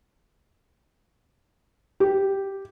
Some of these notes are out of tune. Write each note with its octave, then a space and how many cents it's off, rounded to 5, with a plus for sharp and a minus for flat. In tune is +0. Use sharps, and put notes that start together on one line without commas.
G4 -5